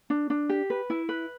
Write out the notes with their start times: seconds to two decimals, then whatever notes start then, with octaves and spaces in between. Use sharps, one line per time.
0.10 D4
0.30 D4
0.49 G4
0.70 B4
0.90 E4
1.09 B4